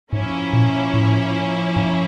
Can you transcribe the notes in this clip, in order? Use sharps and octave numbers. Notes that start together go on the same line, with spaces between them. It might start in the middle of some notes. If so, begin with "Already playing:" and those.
G#2 F3 A#3 C#4 E4
A#2
A2
G#2